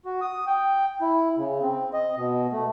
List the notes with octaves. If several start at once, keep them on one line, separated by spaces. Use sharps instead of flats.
F#4
D#6
G5
E4
C#3
C4
D#5
B2
A3